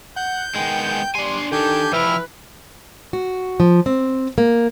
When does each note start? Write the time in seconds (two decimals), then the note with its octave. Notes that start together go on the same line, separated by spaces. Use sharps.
0.16 F#5 G6
0.55 D#3 G#3 B3 G5
1.15 G3 D4 G#5 C6
1.52 D#3 D4 G4 A4 G#5 G6
1.93 E3 F3 E4 G4 B4 E5 F6
3.13 F#4
3.60 F3
3.86 C4
4.38 A#3